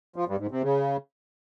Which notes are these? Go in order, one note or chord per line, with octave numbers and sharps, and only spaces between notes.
F3
G2
G#2
C3
C#3